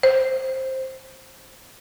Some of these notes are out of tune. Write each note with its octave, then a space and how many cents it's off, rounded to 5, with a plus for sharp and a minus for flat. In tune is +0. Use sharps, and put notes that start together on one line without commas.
C5 +10